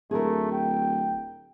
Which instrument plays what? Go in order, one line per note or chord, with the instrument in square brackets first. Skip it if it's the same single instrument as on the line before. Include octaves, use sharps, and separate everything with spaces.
[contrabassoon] D1 [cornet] A3 [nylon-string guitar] G#4 A#4
[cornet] G5